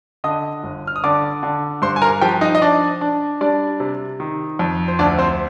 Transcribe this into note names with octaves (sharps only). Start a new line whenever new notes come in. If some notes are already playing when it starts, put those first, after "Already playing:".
D3 D#5 D#6
G1
F6
D#6
D3 D5 D6
D3
G2 C5 C6
G#5
A#4 A#5
F3 G4 G5
D#4 D#5
D#5
D4 D5
D4
G3 D4 D5
C3
D#3
F2
C5
D2 D4 D5
C4 C5